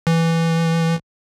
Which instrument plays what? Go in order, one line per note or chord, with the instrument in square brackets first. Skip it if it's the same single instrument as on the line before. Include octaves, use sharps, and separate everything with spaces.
[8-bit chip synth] E3